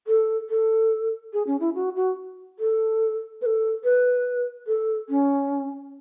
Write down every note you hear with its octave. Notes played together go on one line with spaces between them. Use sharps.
A4
A4
G#4
C#4
E4
F#4
F#4
A4
B4
A4
B4
A4
C#4